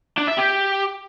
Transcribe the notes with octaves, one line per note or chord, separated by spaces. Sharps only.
D4
E5
G4